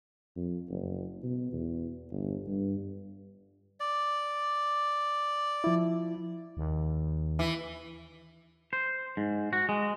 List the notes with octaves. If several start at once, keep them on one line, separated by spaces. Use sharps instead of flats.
F2
F#1
B2
E2
G1
G2
D5
F3 E4
D#2
E3
C5
G#2
F#4
G#3